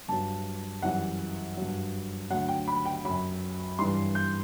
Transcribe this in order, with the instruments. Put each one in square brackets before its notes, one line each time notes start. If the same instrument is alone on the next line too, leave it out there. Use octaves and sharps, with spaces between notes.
[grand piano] G2 F#3 A5
F#2 E3 G3 F#5
G2 F#3
D2 D3 F#3 F#5
G5
B5
G5
F#2 F#3 B5
G2 E3 G3 C6
G6